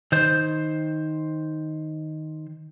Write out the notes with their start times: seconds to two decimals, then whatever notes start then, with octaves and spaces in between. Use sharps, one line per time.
0.12 D#3 C5